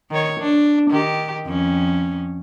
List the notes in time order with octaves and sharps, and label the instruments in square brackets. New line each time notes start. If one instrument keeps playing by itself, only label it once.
[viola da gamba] D#3 C#5
D4
D#3 G4
F2 C#4